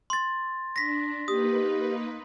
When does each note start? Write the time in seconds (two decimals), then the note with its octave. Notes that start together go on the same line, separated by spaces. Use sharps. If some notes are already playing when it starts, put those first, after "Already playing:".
0.10 C6 A6
0.76 D4 A#6 B6
1.28 A#3 D#4 G4 B4 D#6